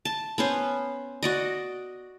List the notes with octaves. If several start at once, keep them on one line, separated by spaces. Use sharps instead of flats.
A5
B3 C#4 C5
F#4 D5 D#5